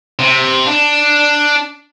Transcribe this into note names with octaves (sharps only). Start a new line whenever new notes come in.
C3
D4